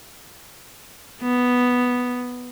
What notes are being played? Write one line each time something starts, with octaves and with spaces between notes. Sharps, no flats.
B3